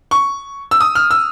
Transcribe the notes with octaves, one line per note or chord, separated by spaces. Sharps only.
C#6
E6
D#6
F6
E6